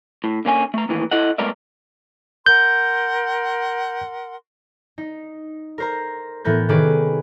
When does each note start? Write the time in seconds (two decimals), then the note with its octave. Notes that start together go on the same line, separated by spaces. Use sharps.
0.24 A2
0.45 D3 A#3 C#4 G#5
0.74 A3 A#5
0.89 D#2 A2 D#3 E3
1.11 E4 A4 D#5 F#5
1.38 G#3 A3 B3 A#4 D5 E5
2.46 A#4 F#5 C6 G6
4.98 D#4
5.78 A#4 C5 A#5
6.45 A2 E3 B3 A#4 G6
6.69 C3 D#3 C#4 G#4 B4 D6